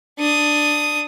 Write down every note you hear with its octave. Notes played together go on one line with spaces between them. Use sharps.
D4 D#6